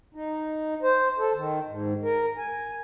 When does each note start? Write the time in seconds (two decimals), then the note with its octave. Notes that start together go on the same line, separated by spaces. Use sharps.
0.15 D#4
0.83 C5
1.19 A4
1.35 D#3
1.67 G#2
2.03 A#4
2.38 G#5